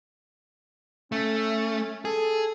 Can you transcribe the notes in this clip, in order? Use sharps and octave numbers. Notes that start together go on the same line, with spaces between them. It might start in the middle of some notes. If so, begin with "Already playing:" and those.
A3 C#4
G#4 A4